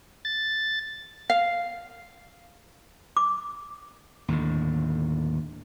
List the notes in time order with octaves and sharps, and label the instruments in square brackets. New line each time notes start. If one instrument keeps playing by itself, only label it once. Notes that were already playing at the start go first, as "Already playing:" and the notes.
[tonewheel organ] A6
[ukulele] F5
[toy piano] D6
[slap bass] D#2 A2 D3